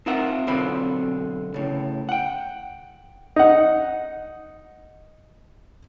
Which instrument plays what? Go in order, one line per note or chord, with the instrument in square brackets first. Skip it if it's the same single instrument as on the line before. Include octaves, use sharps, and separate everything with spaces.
[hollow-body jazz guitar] C4 D#4 F4 A#4 E5 F#5
B1 D3 C4 B5
A2 C#3
F#5 G5
[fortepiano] D#4 F#5